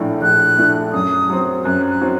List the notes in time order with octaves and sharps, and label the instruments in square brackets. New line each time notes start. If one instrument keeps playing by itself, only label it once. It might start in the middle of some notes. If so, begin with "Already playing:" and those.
Already playing: [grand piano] A#1 A2 A3 D4
[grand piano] A#1 [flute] F#6
[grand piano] A2 A3 D4
[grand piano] F#2 [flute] D#6
[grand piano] F#3 C4
[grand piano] F#2 [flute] F#6
[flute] F#6
[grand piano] F#3 C4